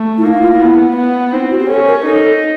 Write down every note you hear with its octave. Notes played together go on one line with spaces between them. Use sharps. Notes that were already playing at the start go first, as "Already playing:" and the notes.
Already playing: A3
E4
A#3 D#4
E4
F4
E4
B3
B3
C4 D#4
E4
F#4
G4
C#4 A4
A#4
D#4 A4